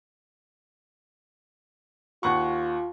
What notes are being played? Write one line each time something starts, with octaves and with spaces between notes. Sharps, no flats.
D#2 F4 F#5 C#6